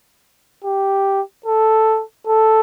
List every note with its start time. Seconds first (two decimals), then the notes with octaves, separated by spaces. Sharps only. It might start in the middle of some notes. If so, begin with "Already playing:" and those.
0.64 G4
1.46 A4
2.27 A4